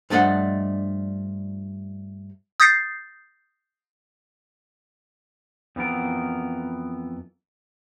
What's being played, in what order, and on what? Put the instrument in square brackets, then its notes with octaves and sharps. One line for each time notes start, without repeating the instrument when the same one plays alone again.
[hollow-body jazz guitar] G2 F3 A3 D4 D#5 F#5
[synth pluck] D#6 G6 A6 A#6 C7
[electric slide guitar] F2 E3 B3 A#4